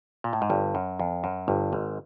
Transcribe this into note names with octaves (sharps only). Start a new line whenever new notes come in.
A#2
A2
G#2
G1 G2
F#2
F2
F#2
G1 G2
G#1 G#2